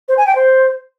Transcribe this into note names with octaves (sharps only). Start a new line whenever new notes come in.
C5
G#5
G5
C5